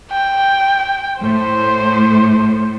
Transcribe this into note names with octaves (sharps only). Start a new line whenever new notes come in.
G5
A2 C5